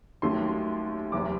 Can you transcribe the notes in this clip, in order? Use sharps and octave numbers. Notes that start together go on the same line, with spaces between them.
D#2 D#3 F#3 A3 C#4 C6
F#1 E2 C3 D6